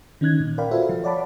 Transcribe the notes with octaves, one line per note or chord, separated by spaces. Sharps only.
D#3 C#4 D#4 F#6 G#6
A#2
A#4 D5 F5 G5 B5
F4 F#4 A4 B4 C5 E5
F3 F5
C#5 D5 F#5 A5 B5 D6